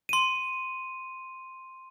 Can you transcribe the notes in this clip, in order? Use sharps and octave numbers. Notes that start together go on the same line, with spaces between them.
C6 D#7